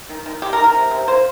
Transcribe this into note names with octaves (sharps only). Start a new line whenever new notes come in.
D#3
D#3
D#3 G4
A#4
D#3
A#4
C3
C3
A#3 C5